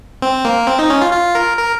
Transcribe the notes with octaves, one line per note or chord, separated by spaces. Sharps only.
C4
A#3
C4
D#4
C#4
F4
F4
A#4
A#4